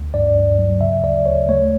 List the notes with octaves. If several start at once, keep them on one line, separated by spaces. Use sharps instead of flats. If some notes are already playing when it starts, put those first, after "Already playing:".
Already playing: D2
G2 D5
G2
F#3
C#3 E5
D2 D5
D2 C#5
A3 C#5